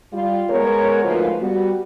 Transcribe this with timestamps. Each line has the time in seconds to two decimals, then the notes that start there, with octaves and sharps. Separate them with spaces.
0.12 G3 F4
0.49 G#3 B3 A#4 C#5
1.03 D2 G#2 F3 A#3 F4 B4
1.40 G3 B3 F#4